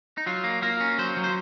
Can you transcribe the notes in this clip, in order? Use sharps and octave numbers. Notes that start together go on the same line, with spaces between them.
D#4
F#3 F4
A#3
A#3 A#4
C#4
F#3 C5
F#3
C5